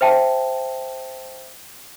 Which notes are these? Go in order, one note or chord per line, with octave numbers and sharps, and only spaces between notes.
C5 E5 G5 A5